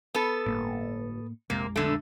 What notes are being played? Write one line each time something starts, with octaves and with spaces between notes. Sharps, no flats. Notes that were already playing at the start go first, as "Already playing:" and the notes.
B3 A4
G1 A2 A#3
A#1 F2 C3 G#3 A#3
B1 D3 A3